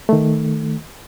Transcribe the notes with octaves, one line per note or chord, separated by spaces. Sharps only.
D#3 A3